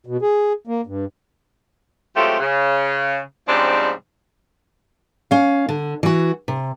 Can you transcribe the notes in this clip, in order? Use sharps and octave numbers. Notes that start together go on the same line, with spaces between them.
B2
G#4
A#3
G2
F#3 G#3 A3 C4 F4 G4
C#3
G#2 C#3 F3 G3 C4 D4
C#4 F5
D3
E3 F#4
C3